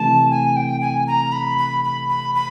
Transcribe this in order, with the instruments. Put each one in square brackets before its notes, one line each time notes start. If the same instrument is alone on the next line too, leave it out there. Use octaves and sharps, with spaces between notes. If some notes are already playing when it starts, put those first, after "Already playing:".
Already playing: [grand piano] C3 E3 A3 [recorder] A5
[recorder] G#5
G5
G#5
A#5
B5
B5
B5
B5
B5